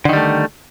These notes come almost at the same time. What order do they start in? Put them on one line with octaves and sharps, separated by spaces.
D3 D#3 G3 A3